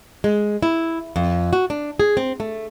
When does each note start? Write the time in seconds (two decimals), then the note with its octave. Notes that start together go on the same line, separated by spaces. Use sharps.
0.24 G#3
0.63 E4
1.16 F2
1.53 F#4
1.70 D4
2.00 G#4
2.17 C4
2.40 A3